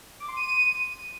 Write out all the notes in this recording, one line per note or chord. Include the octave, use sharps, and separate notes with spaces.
D6
C6
D#7